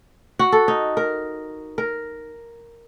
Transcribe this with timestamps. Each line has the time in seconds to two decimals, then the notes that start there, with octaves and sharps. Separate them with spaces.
0.39 F#4
0.52 A4
0.68 D#4
0.97 A#4
1.78 A#4